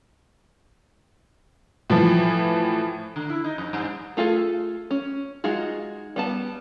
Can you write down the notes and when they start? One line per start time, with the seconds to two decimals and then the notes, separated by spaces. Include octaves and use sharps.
1.90 A2 E3 F3
3.16 D3
3.29 E4
3.44 D#4
3.58 F2
3.73 G2
4.17 A3 F4 G#4 A4
4.91 C#4
5.44 G#3 D#4 F4 F#4 G#4
6.16 G3 B3 A5